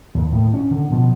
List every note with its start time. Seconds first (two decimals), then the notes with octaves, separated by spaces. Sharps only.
0.15 D#2
0.32 A2
0.54 C#4
0.71 D3
0.91 B2 F3